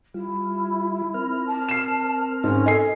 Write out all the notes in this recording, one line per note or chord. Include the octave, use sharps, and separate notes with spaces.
G3 E4 F4
C4 A#4 F6
A5
C7 E7
G#2 C#4
A4 D#5 G#5 C7